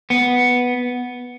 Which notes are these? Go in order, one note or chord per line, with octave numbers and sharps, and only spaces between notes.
B3